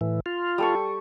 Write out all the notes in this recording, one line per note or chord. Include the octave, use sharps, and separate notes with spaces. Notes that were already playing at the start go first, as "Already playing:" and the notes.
A2 E3
F4
G3 A4 C#6